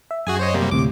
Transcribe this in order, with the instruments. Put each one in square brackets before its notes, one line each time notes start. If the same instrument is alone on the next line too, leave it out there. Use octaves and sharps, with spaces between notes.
[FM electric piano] E5
[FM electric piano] F#2 [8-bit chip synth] F#4 G#4 G#5
[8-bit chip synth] C5 C#5 D#5
C3 G3 A#3
[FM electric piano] D2 A2 C3 [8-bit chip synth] D6